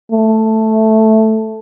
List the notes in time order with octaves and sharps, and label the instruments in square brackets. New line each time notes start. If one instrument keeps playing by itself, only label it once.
[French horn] A3